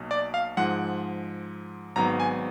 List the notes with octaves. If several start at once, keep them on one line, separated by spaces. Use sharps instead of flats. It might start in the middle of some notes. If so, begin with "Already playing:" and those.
Already playing: B1 B2 A#3
D5
F5
G#2 F3 G#3 F#5
G#1 G#2 F#3 B3 A#5
G#5